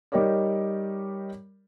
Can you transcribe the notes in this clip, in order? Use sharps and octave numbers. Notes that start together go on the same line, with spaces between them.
G3 D#4 G4 A#4 C#5 D5